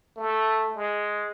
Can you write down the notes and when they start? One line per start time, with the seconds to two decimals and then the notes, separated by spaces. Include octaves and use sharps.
0.17 A3
0.76 G#3